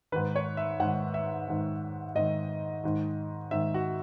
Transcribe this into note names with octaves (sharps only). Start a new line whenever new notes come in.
G#2 D#3 B4
C#5
E5
G#2 D#3 F#5
E5
G#2 D#3
G#2 D#3 D#5
G#2 D#3
G#2 D#3 E5
F#4